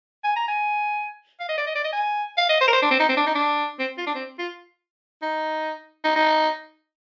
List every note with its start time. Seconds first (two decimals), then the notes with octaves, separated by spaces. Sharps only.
0.24 G#5
0.36 A#5
0.48 G#5
1.40 F5
1.49 D#5
1.58 D5
1.67 D#5
1.75 D5
1.84 D#5
1.93 G#5
2.38 F5
2.49 D#5
2.61 C5
2.68 A#4
2.73 C5
2.82 D4
2.91 C4
3.00 D#4
3.09 C4
3.17 D4
3.27 D#4
3.35 D4
3.79 C4
3.98 F4
4.07 D4
4.15 C4
4.39 F4
5.22 D#4
6.04 D#4
6.16 D#4